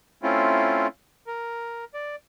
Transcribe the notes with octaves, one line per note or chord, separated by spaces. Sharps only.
A3 C4 C#4 E4 F4
A#4
D5